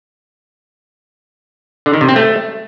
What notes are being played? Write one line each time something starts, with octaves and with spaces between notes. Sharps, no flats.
D3
D#3
C3
C4
A3